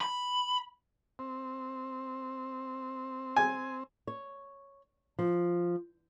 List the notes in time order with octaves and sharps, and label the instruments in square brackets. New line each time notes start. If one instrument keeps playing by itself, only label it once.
[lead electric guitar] B5
[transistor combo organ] C4
[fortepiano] G#5
[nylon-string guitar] C#5
F3